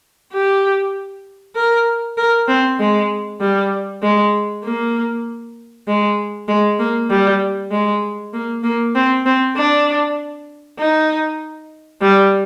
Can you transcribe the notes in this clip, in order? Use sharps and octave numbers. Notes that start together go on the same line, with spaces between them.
G4
A#4
A#4
C4
G#3
G3
G#3
A#3
G#3
G#3
A#3
G3
G#3
A#3
A#3
C4
C4
D4
D#4
G3